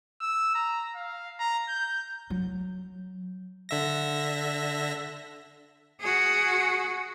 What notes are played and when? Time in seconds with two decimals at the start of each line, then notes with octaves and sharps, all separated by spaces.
0.21 E6
0.55 A#5
0.95 F5
1.39 A#5
1.69 G6
2.30 F#3
3.69 D3 E5 A#6
6.01 F#4 G#4